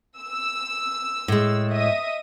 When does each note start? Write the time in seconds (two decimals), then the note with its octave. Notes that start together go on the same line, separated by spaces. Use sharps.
0.17 E6
1.28 A2 G#3
1.69 D#5 E5 D#6